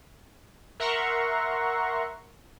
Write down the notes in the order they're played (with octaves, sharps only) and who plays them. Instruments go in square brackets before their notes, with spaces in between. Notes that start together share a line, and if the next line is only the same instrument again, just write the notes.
[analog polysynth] A#4 E5 F#5 A#5 C6 C#6